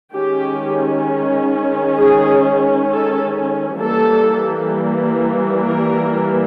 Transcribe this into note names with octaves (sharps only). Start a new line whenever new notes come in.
D#3 G#3 C#4 G4
G#4
A4
E3 G3 A#3 A4
A#4